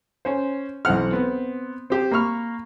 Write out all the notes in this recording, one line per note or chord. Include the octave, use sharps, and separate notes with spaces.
C#4 C5
B1 E3 C4 F#5 F6
B3 C4
C4 G4 C5
A#3 B5 C#6 F6